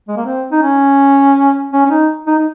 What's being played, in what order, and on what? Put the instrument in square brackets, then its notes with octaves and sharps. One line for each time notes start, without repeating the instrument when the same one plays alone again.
[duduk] G#3
A#3
C4
D#4
C#4
C#4
C#4
D#4
D#4
D#4